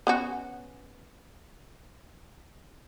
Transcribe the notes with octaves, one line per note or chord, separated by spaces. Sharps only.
B3 C#4 F#4